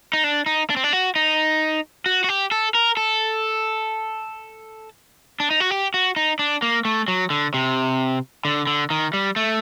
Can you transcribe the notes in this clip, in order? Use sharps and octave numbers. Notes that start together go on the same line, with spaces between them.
D#4
D4
D#4
D4
C4
D4
F#4
D#4
F#4
F#4
G4
A4
A#4
A4
D4
D#4
F#4
G4
F#4
D#4
D4
A#3
A3
F#3
D3
C3
D3
D3
D#3
G3
A3